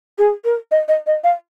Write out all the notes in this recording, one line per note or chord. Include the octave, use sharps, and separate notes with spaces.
G#4
A#4
D#5
D#5
D#5
F5